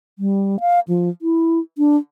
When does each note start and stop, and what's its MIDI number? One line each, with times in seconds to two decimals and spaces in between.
0.19 0.60 55
0.60 0.80 77
0.88 1.09 53
1.22 1.60 64
1.78 1.97 62